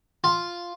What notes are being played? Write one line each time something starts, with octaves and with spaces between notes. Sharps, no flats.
F4